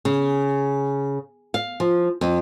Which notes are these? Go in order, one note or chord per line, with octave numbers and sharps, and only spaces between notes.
C#3
F5
F3
F2